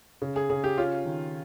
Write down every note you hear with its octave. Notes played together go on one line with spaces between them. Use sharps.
C#3
G#4
C#3 G#4
G4
C#4 F4
D#3